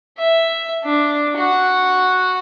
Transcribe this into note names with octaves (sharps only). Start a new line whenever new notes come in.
E5
D4
F#4 F#5